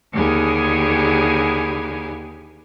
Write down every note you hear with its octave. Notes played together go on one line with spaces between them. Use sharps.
D#2 D3 G4 G#4 G#5 B5